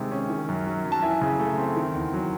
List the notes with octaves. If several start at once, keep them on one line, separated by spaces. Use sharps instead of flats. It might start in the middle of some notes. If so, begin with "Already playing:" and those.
Already playing: C3 D#3 G#3
C#4
D#3
F#2
F#3
F#2
A5
E3 E5 G#5
C#3
A3
C4
D#3
E2
F#3